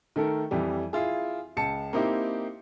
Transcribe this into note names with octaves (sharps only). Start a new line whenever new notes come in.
D#3 A3 A4 A#4
F2 E3 G3
E4 F4 G#4
C#2 A5 C#7
A#3 C4 D#4 E4 G4